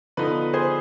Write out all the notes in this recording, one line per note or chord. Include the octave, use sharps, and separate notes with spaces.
D3 F3 B3 D#4 B4
G#4 C5